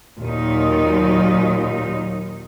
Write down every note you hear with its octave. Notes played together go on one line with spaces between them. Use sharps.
D#2 A#2 F#3 D#4